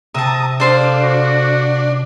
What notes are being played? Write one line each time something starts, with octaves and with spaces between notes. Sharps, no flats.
C3 E5 A5 A#5 D#6
D4 A4 C5 F5
F#4